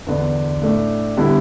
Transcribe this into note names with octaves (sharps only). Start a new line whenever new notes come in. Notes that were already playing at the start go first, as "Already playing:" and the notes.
E2 D3 B3 D4
A2 A3 D4
D3 G3 B3 E4